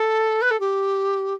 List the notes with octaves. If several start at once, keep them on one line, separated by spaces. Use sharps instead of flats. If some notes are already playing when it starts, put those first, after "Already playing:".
Already playing: A4
B4
A4
G4